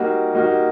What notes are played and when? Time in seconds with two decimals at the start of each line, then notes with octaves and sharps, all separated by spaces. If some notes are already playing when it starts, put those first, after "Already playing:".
Already playing: G3 A#3 D#4 F#4
0.33 G3 A#3 D#4 F#4